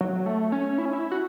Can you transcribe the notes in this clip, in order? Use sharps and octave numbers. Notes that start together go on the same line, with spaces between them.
F#3
A3
C#4
E4
C#4
E4
F#4